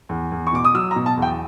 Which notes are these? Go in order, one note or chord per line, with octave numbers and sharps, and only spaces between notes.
E2
E2
C#6
B2 D6
D#6
F#3 E6
A#5
B2
A5
E2
G5